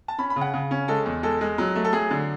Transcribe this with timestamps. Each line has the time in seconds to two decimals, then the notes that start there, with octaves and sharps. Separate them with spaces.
0.08 A5
0.18 C#4 B5
0.30 B5
0.36 C#3
0.41 F#5
0.54 C#3
0.71 C#4
0.88 G#3 A4
1.06 E2
1.23 G#3 A4
1.41 G#3
1.58 F#3
1.75 A3
1.85 A4
1.93 F#3 G#4
2.11 D3